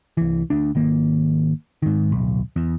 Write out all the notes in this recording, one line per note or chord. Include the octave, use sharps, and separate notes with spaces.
C2 E3
D2 D4
G#1 D#3 A#3
G#2 D#3
D1 B1
E2